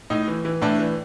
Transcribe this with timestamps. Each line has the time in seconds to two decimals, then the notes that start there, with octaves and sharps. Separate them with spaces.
0.10 A2 D#4
0.28 E3
0.45 E3
0.61 A2 D4 E4
0.79 E3